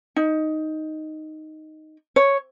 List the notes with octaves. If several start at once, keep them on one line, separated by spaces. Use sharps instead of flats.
D#4
C#5